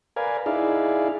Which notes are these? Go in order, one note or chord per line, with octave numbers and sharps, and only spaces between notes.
A#4 B4 D5 F5 G#5
D#4 E4 G#4 D5 F5